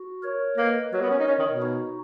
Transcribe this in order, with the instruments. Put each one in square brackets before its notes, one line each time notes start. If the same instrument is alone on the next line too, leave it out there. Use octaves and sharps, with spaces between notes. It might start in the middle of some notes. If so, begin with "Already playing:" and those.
Already playing: [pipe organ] F#4
A#4 C#5
[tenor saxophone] A#3 [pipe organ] B4 D#5
[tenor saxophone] F#3 [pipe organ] A#4 C#5
[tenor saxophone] B3
C#4
D#4
[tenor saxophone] C#4 [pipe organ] A#4 C#5
[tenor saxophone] D#3
B2
[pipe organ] D#4 F#4